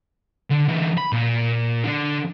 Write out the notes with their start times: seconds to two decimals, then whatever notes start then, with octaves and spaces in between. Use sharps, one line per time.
0.51 D3
0.69 D3 E3
0.98 B5
1.12 A#2
1.84 D3 D4